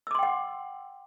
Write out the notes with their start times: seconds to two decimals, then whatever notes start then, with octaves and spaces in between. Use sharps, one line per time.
0.07 E6
0.11 D6
0.15 C6
0.19 G5
0.23 F#5